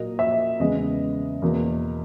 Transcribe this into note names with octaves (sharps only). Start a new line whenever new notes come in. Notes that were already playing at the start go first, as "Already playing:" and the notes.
Already playing: A#2 F#3 A#3 D#5
E5
E2 C#3 G#3 B3 D#5
E2 B2 A#3